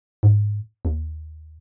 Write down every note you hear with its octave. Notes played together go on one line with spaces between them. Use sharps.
G#2
D#2